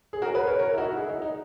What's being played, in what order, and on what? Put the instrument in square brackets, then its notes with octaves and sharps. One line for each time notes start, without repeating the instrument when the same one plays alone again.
[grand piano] G#4
F#4 A#4
G#4 B4
A#4 C#5
A#4 C#5
E4
D#4 F#4
E4 G#4
D#4
D#4